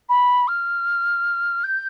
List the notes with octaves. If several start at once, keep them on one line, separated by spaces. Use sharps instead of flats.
B5
F6
G6